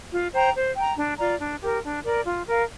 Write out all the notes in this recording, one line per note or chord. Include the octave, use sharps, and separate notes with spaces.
F4
C5 G5 A#5
C5
G5 A#5
D4
F4 D5 A#5
D4
G4 A#4
D4
A#4 D5
F4
A#4 F5